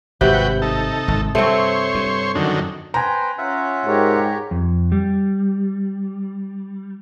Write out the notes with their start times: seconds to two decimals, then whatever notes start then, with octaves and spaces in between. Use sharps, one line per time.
0.21 G#1 G2 C3 F#4 B4 G5
0.62 D#4 A4
1.08 G#1
1.35 G2 A3 C4 C5 C#5
1.95 G2
2.35 F#2 D3 D#3
2.94 B4 C5 G5 G#5 A#5
3.38 C#4 F4 E5 F#5
3.86 G#2 G4 A#4 C#5
4.51 F2
4.92 G3